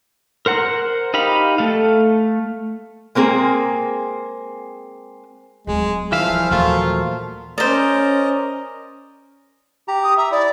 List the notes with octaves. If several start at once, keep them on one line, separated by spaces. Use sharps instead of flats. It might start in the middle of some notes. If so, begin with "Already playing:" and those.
A#4 C5 F#5 A#5
D#4 G4 F5 B5
A3 A4 F5
G#3 A#3 C4 G#4
D1 G#3
C2 E3 F3 E5 F5
D#2 A#2 E3 F#3 A3 F4
C#4 A#4 C5 D5 D#5 A#5
G4 A#5
D#6
E5 A#5
E4 D5